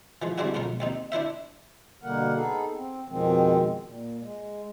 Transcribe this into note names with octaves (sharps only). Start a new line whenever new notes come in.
E3 F3 G#3
G3 G#3 C4 D4 E4 F#4
B1 G#2 F3 A#4
D#2 C4 D#4
D4 E4 C5 E5
B2 D3 G3 A#3 A#4 F#5
B3 D#4 G#4 A4
C4
F2 B2 D#3 F3 G#3 C4
A#2
G#3